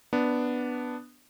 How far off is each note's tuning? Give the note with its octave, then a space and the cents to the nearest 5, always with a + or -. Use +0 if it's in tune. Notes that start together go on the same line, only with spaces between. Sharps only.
B3 +0 D4 +0